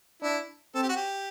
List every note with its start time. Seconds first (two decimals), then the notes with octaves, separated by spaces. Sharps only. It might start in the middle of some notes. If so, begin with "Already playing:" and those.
0.22 D4 E4
0.75 C4 A4
0.82 G4
0.89 F#4
0.96 G4